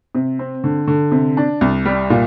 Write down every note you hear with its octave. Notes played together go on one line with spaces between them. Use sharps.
C3
C4
D3
D3
C3
D4
C2
G3
A#2